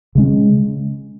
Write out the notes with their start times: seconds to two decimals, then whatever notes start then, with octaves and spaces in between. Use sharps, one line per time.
0.15 C#3 G#3 C#4